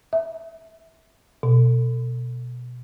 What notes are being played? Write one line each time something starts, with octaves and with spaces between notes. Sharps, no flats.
E5
B2